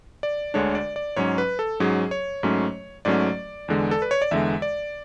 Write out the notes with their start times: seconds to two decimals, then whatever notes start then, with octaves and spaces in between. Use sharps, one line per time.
0.23 D5
0.54 D2 D3 G#3 D4 C#5
0.75 D5
0.96 D5
1.16 G#2 F#3 C#4 C#5
1.38 B4
1.59 A4
1.80 G#2 F#3 C#4 G#4
2.11 C#5
2.43 G#2 F#3 A3 C#4
3.05 G#2 F#3 A3 C#4 D5
3.68 E2 D3 G#3
3.91 A4
4.02 B4
4.11 C#5
4.22 D5
4.31 E2 D3 G#3 E5
4.62 D5